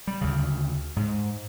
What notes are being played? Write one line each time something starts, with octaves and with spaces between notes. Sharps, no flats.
G3
D2 C#3
G#2